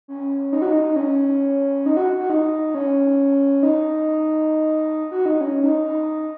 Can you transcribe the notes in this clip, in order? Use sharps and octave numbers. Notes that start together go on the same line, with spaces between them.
C#4
D#4
F#4
D#4
D#4
C#4
D#4
F#4
F#4
D#4
C#4
D#4
F#4
D#4
C#4
D#4
D#4